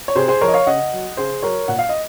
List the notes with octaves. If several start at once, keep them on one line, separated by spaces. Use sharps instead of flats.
C#5
C3 G#4 C5
G#4 C5
F3 A#4 C#5
D#5
C#5 F5
C#3 D#5 F#5
F#3
C#3 G#4 C5
F#3 A#4 C#5
A#2 F#5
F5
D#5